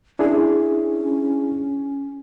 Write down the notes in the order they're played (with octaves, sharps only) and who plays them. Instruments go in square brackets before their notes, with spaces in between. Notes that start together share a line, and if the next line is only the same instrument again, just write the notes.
[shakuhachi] C#4 [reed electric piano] D4 E4 G#4